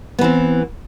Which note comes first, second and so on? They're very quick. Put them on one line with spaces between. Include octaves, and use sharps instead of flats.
B3 E3 C4